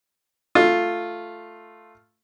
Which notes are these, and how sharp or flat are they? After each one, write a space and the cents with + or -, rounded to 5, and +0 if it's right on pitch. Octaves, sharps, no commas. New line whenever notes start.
A3 +0 F4 +0